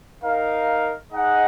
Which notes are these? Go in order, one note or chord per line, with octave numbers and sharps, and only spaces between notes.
D#4 A#4 F5
D#4 G#4 D#5 F#5